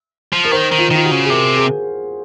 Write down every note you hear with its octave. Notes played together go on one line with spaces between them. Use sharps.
F3
A#4
D#3 C5
D#3
F4
D#3 F4
F#4
C#3
G#4
C3 A#4
G#4